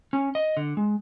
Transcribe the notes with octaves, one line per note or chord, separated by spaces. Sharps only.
C#4
D#5
D3
G#3